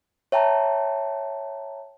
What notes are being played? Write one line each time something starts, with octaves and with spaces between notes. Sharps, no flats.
C#5 E5 G5 A5 A#5